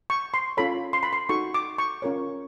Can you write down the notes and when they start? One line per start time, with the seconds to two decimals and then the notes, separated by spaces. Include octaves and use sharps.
0.10 C#6
0.34 C6
0.57 C#4 F4 A4 C#5 B5
0.93 C6
1.03 B5
1.13 C6
1.29 D#4 F#4 A4 C#6
1.54 D6
1.78 C#6
2.02 C#4 F4 A#4 C#5